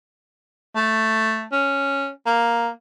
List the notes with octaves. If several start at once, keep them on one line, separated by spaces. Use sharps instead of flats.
A3
C#4
A#3